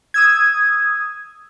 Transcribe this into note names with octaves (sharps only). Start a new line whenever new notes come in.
D#6 E6 G#6